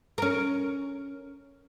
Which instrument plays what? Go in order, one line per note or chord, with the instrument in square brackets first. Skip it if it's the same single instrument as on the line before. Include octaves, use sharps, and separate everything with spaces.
[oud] C#4 A#4